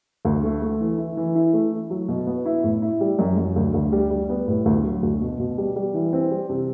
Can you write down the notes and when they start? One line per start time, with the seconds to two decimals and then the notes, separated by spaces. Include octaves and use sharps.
0.25 D2
0.43 A3
0.62 A3
0.80 E3
0.98 E4
1.17 E3
1.35 E4
1.54 A3
1.72 E4
1.90 F#3
2.08 B2
2.27 B3
2.46 E4
2.64 A2
2.82 E4
3.01 G3
3.19 F#2
3.37 F#2
3.56 D2
3.74 D2
3.92 G3
4.11 G3
4.30 B3
4.47 A2
4.66 D2
4.84 F#3
5.03 D2
5.21 B2
5.39 B2
5.58 G3
5.76 G3
5.94 E3
6.13 C4
6.31 G3
6.49 C3